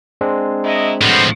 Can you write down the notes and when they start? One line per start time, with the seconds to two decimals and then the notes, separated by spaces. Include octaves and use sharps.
0.21 G#3 C4 D4
0.64 F#3 E4 D#5
1.01 A2 F3 B3 F#4 C5